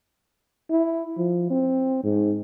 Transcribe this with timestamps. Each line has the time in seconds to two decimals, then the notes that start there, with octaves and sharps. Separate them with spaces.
0.70 E4
1.17 F3
1.50 C4
2.04 G#2